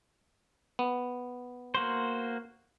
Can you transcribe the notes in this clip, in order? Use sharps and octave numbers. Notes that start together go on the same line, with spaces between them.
B3
A#3 F#4 C5